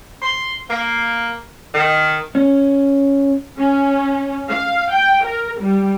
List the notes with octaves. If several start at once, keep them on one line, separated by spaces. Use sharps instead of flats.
C6
A#3
D#3
C#4
C#4
F5
G5
A#4
G3